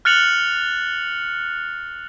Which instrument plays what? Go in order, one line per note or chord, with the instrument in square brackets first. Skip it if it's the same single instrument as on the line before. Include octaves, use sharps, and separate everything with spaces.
[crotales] F6 F#6 A6 C#7 F7 F#7